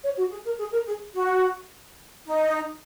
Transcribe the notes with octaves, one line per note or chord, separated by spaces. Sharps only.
C#5
F#4
G#4
A#4
G#4
A#4
G#4
F#4
D#4